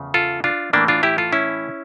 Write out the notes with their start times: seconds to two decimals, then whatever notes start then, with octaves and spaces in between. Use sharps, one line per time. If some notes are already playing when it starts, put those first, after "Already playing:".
Already playing: E2 C#3 F3 A3
0.14 F4 A4
0.44 D4 F4
0.73 A2 E3 A3 A#3 D4
0.88 D4 F4
1.03 E4 G4
1.18 F4 A4
1.32 C#4 E4